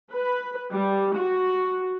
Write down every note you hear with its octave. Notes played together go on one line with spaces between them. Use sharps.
B4
G3
F#4